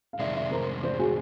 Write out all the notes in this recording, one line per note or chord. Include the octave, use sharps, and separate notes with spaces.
F5
F2 C3 D#3 G#3 D5 E5
D5 E5
A#4 C5
C5 D5
F#4 G#4